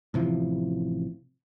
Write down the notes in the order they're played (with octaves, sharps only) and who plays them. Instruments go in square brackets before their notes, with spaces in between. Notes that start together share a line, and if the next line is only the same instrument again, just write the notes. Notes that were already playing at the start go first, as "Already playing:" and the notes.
[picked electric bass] A1 C3 E3 F3